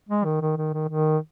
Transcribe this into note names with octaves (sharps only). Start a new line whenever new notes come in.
G#3
D#3
D#3
D#3
D#3
D#3